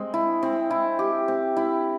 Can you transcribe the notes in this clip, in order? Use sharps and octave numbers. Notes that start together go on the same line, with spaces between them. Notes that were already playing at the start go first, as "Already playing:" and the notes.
Already playing: G#3 C4
E4
C4
E4
G4
C4
E4